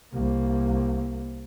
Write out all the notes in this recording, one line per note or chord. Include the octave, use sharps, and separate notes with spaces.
C2 A#3